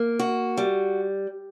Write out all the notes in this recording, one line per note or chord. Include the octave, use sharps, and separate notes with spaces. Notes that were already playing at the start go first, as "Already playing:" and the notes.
Already playing: A#3
F#4
G3